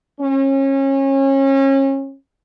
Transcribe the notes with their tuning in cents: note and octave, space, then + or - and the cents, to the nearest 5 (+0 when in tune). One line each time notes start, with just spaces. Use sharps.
C#4 -30